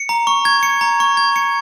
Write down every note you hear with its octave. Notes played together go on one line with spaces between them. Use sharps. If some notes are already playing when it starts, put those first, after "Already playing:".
Already playing: C#7
A#5
C#6
G#6
C#7
A#5
C#6
G#6
C#7